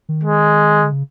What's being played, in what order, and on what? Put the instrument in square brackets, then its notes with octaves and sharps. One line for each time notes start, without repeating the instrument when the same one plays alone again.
[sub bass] D#3
[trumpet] G#3
[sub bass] D3
C#3